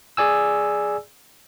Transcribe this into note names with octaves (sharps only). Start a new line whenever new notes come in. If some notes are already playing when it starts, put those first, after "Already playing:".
G#4 D5 G#5 E6